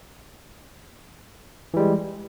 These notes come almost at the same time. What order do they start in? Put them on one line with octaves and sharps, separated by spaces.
E3 G3 G#3